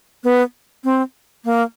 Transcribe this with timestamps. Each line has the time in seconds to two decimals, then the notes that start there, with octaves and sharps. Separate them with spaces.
0.24 B3
0.84 C4
1.45 A#3